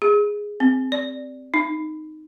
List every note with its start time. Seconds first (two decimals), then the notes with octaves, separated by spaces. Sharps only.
0.02 G#4
0.60 C4
0.92 D5
1.54 D#4